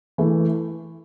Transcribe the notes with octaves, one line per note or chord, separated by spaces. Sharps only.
E3 A3